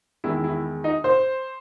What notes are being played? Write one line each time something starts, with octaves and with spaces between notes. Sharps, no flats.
E2 D#3 G#3 E4
E4
D#4
C5